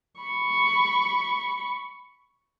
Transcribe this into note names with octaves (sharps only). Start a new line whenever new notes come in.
B5 C#6